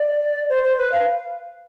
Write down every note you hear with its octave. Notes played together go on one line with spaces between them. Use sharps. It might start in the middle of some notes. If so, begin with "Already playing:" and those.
Already playing: D5
C5
C5
B4
F5